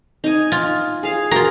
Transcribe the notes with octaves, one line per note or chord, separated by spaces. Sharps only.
D#4 G#5
F4
G#4 F5
F4 F#4 G#4 A#4 A#5